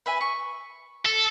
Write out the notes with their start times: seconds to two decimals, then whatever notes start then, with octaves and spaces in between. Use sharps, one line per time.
0.06 B4 E5 G#5
0.21 C#6
1.05 A4